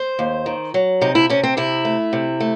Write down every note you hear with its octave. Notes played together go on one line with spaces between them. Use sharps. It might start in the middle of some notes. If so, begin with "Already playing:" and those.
Already playing: C5
D#2
D#3
F#3
C3 D#4
E4
C3 C#4
C4
C3 E4
A3
C3
A3